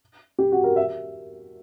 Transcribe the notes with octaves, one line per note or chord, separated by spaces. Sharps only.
G4
F#4
A#4
E5